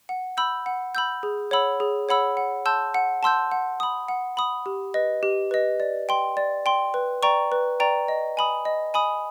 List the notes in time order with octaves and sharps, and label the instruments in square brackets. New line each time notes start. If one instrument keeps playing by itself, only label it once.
[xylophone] F#5
B5 E6 G6
F#5
B5 E6 G6
G#4
C#5 F#5 B5 E6
G#4
C#5 F#5 B5 E6
F#5
A5 C6 E6 G6
F#5
A5 C6 E6 G6
F#5
B5 D#6
F#5
B5 D#6
G4
B4 D#5
G4
B4 D#5
D5
G5 C6
D5
G5 C6
B4
D5 G5 A#5 C#6
B4
D5 G5 A#5 C#6
D#5
G#5 B5 D#6
D#5
G#5 B5 D#6